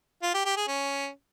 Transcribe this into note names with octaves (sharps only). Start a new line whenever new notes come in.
F4
G4
G4
G#4
C#4